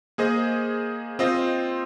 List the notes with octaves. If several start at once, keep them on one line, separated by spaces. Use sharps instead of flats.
A#3 G#4 C5 D#5
C4 F4 C5 D#5